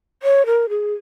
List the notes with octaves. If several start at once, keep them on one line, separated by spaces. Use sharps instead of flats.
C#5
A#4
G#4